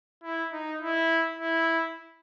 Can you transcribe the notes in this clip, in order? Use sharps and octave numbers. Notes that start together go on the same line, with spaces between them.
E4
D#4
E4
E4